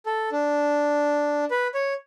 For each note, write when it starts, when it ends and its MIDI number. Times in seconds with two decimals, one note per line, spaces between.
0.06 0.29 69
0.32 1.45 62
1.51 1.68 71
1.74 1.94 73